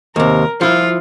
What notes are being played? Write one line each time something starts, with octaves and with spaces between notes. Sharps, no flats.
D#2 C3 A#4
F3 E4 F4